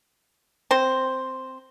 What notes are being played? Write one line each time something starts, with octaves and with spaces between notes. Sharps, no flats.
C4 C5